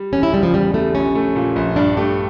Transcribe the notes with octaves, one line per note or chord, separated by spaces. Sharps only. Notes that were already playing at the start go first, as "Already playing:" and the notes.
Already playing: G3
E1 C#4
E4
C#3 G3
F3
E2 G3
G3 A3
A#1 C#4
A3
A#2
A#1
G2 D4
A3 G4